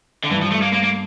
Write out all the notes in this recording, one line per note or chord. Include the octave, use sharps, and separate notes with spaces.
D3
G2 E3
F3
A3
A#3
A#3
A#3